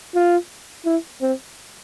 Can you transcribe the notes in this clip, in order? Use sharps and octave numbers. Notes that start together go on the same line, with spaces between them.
F4
E4
C4